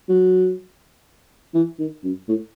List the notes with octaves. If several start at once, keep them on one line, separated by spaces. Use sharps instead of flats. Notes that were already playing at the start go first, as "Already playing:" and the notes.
F#3
E3
D#3
F#2
A2